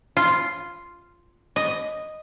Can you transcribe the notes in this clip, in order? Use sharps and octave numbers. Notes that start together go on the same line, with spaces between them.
F4
D#5